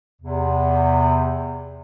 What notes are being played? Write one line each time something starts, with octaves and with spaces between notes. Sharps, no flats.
E2 C3